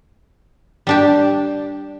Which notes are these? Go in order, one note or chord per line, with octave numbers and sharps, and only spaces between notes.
G3 D4 G4